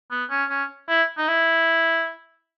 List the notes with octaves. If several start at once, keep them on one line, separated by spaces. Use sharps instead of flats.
B3
C#4
C#4
E4
D#4
E4